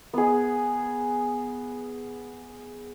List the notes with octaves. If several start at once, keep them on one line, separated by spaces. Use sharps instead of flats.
B3 G#4